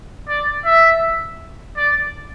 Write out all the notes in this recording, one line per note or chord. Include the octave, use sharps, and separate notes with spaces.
D5
E5
D5